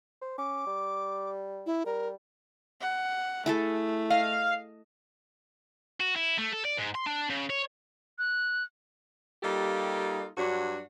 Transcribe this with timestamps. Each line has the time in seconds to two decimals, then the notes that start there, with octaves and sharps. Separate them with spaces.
0.22 C5
0.38 C#4 D6
0.66 G3
1.66 E4
1.86 G3 A#4
2.81 F#5
3.46 A3 E4 G#4 A4
4.10 D#5 F5
6.00 F#4
6.16 E4
6.38 A3
6.52 A4
6.65 D5
6.77 G#2
6.95 C6
7.07 D4
7.30 C#3
7.50 C#5
8.18 F#6
9.43 G3 A#3 D#4 F4 G4 A4
10.37 G2 F#3 D4 F#4